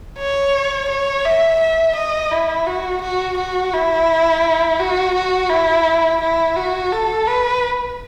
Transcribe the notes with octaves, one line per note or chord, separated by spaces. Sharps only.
C#5
C#5
E5
E5
D#5
E4
F#4
F#4
F#4
E4
F#4
F#4
E4
E4
F#4
A4
B4